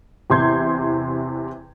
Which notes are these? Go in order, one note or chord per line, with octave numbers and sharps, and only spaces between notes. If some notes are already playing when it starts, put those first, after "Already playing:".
E2 C3 E4 C6 G6 G#6